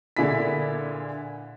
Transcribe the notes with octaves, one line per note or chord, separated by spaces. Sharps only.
A#2 D3 E4 G#4 B5 B6